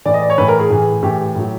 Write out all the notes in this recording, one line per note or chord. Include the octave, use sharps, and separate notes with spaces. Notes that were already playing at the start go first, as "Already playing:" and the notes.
A2 E3 D5
D#5
D5
C#5
A2 E3 B4
A#4
G#4
A2 E3
A2 E3 G4
A2 F#3